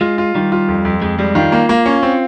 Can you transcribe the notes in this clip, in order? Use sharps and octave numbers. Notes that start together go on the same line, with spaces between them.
G#3 F4
F4
D#3 G3
F4
F2
F2
F2 G#3
G3 G#3
D#3 F4
A#3
A#3
C#4
C4